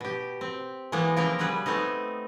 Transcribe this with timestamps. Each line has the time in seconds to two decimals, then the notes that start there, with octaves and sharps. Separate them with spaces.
0.01 B2 G4
0.41 C4
0.92 E3 F#3 G#3 A#3 B3
1.16 C#3 F3 A#3 C4 A#4 G5
1.39 C#3 F#3 G3 G#4 B4
1.66 A3 B3 C4 D#4